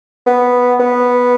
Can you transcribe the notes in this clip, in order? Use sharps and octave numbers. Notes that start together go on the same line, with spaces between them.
B3
B3